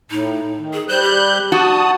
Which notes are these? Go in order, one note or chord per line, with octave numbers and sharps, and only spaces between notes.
A2 D#4
D#3
G#4
G3 C5 F#6 G6
G4
F#4 A5 D#6